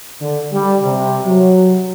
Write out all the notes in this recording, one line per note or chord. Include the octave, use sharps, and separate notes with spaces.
D3
G3
C3
F#3